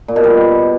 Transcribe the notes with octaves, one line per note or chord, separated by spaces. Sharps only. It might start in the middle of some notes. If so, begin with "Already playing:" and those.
A#2
B2
G3